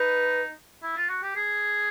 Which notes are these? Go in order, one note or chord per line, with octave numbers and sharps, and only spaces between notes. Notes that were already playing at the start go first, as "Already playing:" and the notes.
Already playing: D#4 B4
E4
F4
F#4
G4
G#4